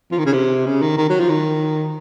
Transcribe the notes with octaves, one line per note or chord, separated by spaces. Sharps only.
F3
D#3
C#3
C3
C#3
D#3
D#3
F#3
F3
D#3